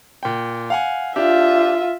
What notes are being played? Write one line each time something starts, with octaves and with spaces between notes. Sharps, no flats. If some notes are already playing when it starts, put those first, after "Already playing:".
A#2 G5
F5 F#5 G#5
D4 F4 G4 E5